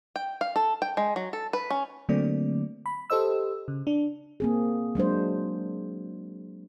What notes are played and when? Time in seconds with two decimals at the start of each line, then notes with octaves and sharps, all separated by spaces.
0.16 G5
0.41 F5
0.56 A4
0.82 G5
0.97 G#3
1.16 F#3
1.33 A4
1.53 B4
1.70 C#4
2.09 D3 F#3 A3 A#3 C4 D5
2.86 B5
3.10 G4 A4 C5 D#5 E6
3.68 C#3
3.87 D4
4.40 A#3 C4 G#4
4.95 F#3 G#3 D4 C5